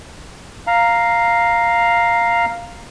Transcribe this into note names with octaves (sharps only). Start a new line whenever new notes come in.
F5 A#5